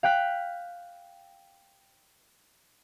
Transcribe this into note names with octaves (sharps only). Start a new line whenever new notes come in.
F5 G5 F#6 B6